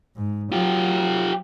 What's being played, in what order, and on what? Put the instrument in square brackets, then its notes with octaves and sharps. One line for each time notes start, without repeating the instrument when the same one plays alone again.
[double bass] G#2
[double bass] F#3 [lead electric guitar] F4 G4